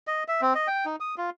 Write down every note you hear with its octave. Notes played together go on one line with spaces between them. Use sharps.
D#5
E5
C4
D#5
G5
D#4
D#6
F4